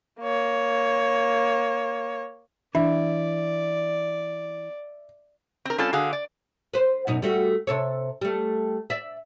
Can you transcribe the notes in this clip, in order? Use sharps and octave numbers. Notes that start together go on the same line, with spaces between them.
A#3 C#5
E3 D4 D5 E5
C4 A#4
G3 C4 C#4 F4 A4
D3 F#4 G#4 F5
D5
B4 C5
F#2 B2 D#4
G3 A3 F#4
C3 A4 C#5
G3 A3
D5 E5